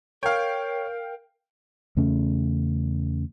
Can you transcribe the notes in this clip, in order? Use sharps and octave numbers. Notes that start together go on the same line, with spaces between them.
A#4 C#5 F5 G5
E2 C#3 A3 C#4